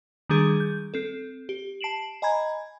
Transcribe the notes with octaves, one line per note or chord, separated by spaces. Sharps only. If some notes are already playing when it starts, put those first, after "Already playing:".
D#3 G3 G#3 D4 G#4
G6
C4 A4
G4
A5 C7 D7 E7 F#7
D#5 G#5 A#5 B5 G#6